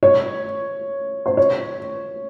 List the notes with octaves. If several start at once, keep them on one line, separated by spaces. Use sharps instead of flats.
C#5
C5
C#5